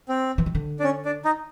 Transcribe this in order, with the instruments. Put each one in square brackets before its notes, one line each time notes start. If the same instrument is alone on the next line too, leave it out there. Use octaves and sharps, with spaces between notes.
[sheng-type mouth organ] C4
[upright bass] E3
D#3
D3
[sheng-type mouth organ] D4
C#4
D4
D#4